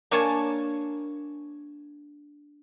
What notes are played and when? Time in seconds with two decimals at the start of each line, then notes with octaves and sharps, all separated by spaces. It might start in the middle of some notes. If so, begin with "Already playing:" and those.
0.11 A#3 D4 A#4 C#5 G#5 A5